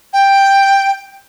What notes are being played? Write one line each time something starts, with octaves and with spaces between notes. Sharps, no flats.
G5